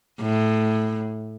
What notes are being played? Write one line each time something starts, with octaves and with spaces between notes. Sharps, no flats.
A2